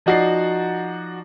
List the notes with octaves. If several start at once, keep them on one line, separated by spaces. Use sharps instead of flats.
F3 D#4 F#4 D5 C7